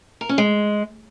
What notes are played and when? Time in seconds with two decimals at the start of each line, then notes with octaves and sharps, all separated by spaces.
0.21 A#4
0.29 C#4
0.38 G#3